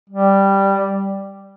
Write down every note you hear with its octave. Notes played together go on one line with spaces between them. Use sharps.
G3